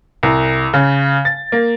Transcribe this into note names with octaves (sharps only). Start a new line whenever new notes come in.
C2
C#3
A6
A#3